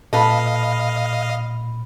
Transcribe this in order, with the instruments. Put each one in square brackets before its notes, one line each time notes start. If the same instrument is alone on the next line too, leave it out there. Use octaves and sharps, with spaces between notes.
[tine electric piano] A#2 B5 [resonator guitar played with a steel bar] A4 B4 [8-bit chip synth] D#5 F5